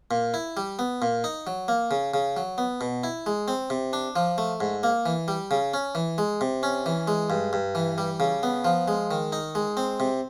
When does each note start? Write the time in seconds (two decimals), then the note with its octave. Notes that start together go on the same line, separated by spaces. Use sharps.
0.11 A#2
0.34 E4
0.57 G3
0.79 B3
1.02 A#2
1.24 D#4
1.47 F#3
1.68 A#3
1.91 C#3
2.14 C#3
2.37 F#3
2.58 B3
2.81 B2
3.04 E4
3.26 G#3
3.48 C4
3.70 C3
3.93 D4
4.16 F3
4.38 A3
4.60 G#2
4.83 A#3
5.06 E3
5.28 G3
5.51 C#3
5.74 C#4
5.95 E3
6.18 G#3
6.41 C3
6.63 C#4
6.86 E3
7.08 G#3
7.30 G2
7.53 G2
7.75 E3
7.98 G3
8.20 C#3
8.43 B3
8.65 F3
8.88 G#3
9.11 D#3
9.32 D#4
9.55 G#3
9.77 C4
10.00 C3